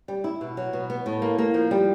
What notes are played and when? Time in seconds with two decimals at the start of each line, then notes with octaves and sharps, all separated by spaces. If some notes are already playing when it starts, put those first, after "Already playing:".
0.08 G3
0.24 E4
0.41 B2
0.57 F#3
0.73 B2
0.90 B3
1.06 A2
1.22 A#3
1.38 A#3
1.54 F3
1.71 G3